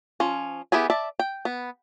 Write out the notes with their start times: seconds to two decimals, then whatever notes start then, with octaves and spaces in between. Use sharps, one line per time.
0.20 F3 C#4
0.72 B3 E4 G4 G#4 G#5
0.90 D5 E5 A5
1.19 G5
1.45 B3